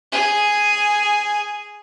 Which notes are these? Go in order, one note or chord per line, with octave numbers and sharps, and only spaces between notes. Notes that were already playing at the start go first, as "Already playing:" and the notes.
G#4 G#5